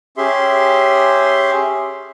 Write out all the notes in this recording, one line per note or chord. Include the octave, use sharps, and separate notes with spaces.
C#4 G4 G#4 E5 C6